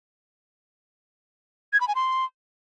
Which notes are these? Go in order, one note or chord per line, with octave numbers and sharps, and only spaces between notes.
G#6
B5
G#5
C6